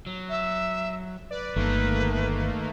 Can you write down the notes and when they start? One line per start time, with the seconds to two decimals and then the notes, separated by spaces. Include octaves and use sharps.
0.06 F#3
0.29 E5
1.30 B4 D5
1.56 G1 D#3 A3 A#3